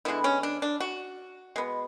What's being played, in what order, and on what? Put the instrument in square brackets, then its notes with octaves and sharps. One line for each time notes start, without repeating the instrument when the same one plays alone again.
[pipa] D3 G#3 B3 E4
C#4
D4
D4
F#4
B2 G#3 B3